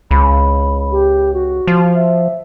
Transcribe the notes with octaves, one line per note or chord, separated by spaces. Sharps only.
C#2 B5
G4
F#4
F3
E5